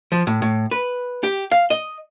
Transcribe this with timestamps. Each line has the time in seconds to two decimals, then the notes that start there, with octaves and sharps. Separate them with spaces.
0.12 F3
0.27 A2
0.42 A2
0.71 B4
1.23 G4
1.52 F5
1.70 D#5